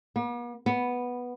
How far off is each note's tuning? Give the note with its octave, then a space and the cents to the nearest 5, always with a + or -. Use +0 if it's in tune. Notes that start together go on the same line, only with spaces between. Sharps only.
B3 -45
B3 -5